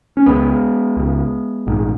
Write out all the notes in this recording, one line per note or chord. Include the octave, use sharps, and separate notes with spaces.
C#4
C#2 C#3 G#3 B3
C#2 C#3
A#1 G#2